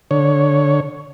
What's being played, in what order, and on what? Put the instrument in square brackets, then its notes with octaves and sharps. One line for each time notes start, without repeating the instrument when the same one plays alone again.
[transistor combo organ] D3 C#5